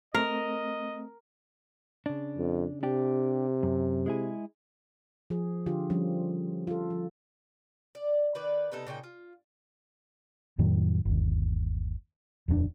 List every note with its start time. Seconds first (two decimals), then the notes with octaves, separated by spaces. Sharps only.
0.15 A3 C4 A#4 D#5
2.06 C#3 D4
2.38 F2
2.83 C3 D4 G4
3.63 F#2
4.06 G#3 E4 G#4
5.30 F3 G#4
5.66 D3 F4 G4
5.90 F3 G3 C#4
6.67 F4 A4
6.90 F3
7.95 D5
8.35 D#3 B4 D5
8.72 C3 B3 D#4 A4
8.87 A#2 C#3 D#4 G5
9.03 F4
10.58 F2 A2 D#3 F#3
11.05 G1 D#2
12.48 D#1 F2 G#3 D4